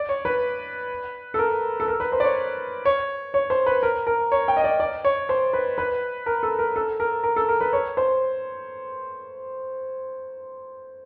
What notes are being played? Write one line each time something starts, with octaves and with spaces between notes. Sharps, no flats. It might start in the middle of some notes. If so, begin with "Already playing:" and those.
Already playing: D5
C#5
B4
A4
A#4
A4
A#4
B4
C5
D5
C#5
C#5
C#5
C5
B4
A#4
A#4
C#5
G5
D#5
D5
D5
C#5
C5
B4
B4
A#4
A4
A#4
A4
A#4
A#4
A4
A#4
B4
C#5
C5